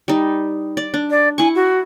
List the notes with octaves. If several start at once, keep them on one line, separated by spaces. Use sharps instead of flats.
G3 D#4
D5
D4
D5
E4 G#5 C#6
F#4